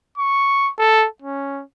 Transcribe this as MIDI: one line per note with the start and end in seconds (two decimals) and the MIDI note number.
0.18 0.71 85
0.79 1.07 69
1.22 1.62 61